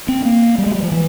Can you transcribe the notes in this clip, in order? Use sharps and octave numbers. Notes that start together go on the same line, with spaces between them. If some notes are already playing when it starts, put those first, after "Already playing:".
C4
A#3
G3
G#3
G3
F3
E3